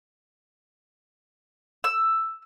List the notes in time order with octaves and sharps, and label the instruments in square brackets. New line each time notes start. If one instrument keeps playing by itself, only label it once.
[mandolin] E6